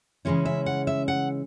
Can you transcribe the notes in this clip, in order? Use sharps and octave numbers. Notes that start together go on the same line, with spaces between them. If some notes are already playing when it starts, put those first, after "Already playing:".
C#3 E3 G#3 C#4 E4
E5
F#5
E5
F#5